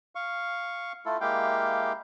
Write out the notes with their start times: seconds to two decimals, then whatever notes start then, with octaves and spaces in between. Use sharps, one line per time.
0.15 F5 C#6
1.06 A3 E4 F4 A4
1.21 G#3 A#3 E4 G4 F5 G5